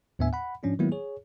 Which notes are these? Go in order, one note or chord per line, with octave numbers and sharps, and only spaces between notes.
D#2 A2 B3 D4 E5 G#5
F#5 B5
G#2 F3 C#4 D4 F4
D#3 F#3 G#3 A#3 B3 E4
G#4 C#5